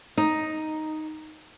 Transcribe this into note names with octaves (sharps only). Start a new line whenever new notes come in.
D#4